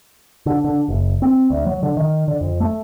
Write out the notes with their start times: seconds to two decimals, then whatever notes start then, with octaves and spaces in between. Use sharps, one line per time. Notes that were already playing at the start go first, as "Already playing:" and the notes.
0.46 D3
0.64 D3
0.89 F#1
1.22 C4
1.50 D2
1.66 F#3
1.83 D3
1.97 D#3
2.28 D3
2.41 F2
2.60 A3